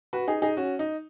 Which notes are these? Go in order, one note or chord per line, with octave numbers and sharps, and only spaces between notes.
F#4 B4
D#4 G#4
D#4 G#4
C#4 F#4
D#4